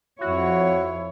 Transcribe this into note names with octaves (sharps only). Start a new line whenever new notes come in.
F2 E4 F#4 C#5